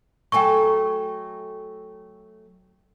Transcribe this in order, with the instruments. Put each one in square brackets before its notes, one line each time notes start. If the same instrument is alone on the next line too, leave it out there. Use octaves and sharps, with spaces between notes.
[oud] F#3 A3 A4 [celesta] G5 G#5 C#6